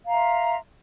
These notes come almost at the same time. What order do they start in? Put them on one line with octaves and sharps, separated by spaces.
F5 A#5 E5 C6